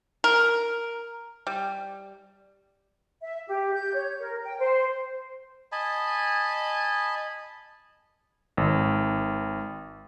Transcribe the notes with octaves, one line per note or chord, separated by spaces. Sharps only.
A#4
G3
E5
G4
G6
C#5
A#4
G5
C5
D#5 G#5 A5 B5
G#1